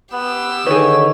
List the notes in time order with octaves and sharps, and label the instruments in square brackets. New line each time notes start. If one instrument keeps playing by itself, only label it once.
[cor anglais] B3 [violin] G4 E6
[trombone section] D3 D#3 [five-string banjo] G#4 B4 [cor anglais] C#5